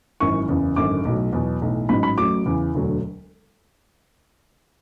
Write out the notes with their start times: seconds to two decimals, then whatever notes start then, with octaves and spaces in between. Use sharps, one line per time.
0.20 G#1 F#2 E3 C#6
0.48 F#1 E2 C#3 E3
0.76 G#1 F#2 D3 D6
1.05 B1 A2 F#3
1.33 E2 B2 F#3
1.62 B1 A2 E3
1.89 A1 G#2 F#3 B5
2.03 B5
2.18 A1 A2 F#3 D6
2.46 E2 C#3 E3
2.74 E1 D2 D3 F#3